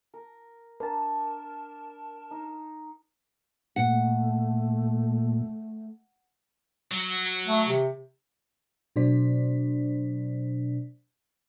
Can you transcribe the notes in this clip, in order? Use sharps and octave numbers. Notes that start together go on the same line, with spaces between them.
A#4
D4 A#4 A5
D#4
A#2 A3 F#5
F#3
A3
C3
B2 F#3 D4 C5 D5 B6